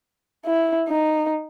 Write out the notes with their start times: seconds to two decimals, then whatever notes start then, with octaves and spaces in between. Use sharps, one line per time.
0.46 E4
0.89 D#4